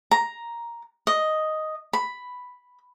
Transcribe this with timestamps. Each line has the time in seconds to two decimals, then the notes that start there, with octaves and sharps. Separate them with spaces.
0.11 A#5
1.07 D#5
1.93 B5